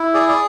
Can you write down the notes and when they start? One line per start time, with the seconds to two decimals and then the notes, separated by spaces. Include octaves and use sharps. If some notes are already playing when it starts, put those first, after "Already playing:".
Already playing: E4
0.14 G#4 D5
0.29 D5